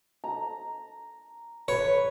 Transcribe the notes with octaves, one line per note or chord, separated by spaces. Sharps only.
A#5
B4 C#5